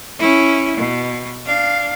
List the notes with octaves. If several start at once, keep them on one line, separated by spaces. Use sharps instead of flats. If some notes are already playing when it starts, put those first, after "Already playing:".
C#4 E4
B2
D4 F5